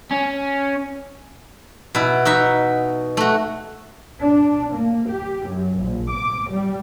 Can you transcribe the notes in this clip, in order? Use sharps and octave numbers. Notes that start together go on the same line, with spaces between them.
C#4
B2 E4
D#4 F#4 E5
A3 F#4
D4
A#3
G4
F#2
A#1
D6
G3